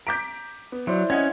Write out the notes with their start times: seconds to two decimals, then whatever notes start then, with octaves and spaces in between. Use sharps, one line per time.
0.07 A#5 D6 G6 B6 D7
0.72 B3
0.87 F#3 E4 C5 D5
1.10 C#4 D#5 F#5 G#6